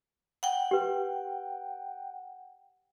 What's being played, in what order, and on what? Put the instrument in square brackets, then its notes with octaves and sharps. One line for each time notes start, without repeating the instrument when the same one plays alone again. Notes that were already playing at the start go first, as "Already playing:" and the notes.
[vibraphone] F#5 G5
[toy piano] G4 B4